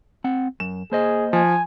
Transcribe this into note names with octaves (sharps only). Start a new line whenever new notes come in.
C4 F#5
F#2 E7
A#3 G#4 C5 D#5
F3 G#5